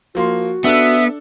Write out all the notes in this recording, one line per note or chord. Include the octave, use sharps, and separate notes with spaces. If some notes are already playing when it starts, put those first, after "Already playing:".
F3 A#3 F#4 C6
B3 D4 A4 E5 E6